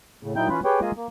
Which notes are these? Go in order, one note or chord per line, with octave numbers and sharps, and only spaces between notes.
A2 C#3
A#2 F#3 D#4 E4 G5 G6
E3 C#4 F4 B4
G4 G#4 B4 C#5 G5
G#3 A#3 F4 G#4 D#5
A#3